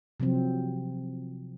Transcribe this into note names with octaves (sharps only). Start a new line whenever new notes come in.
C3 F3 F#3 C4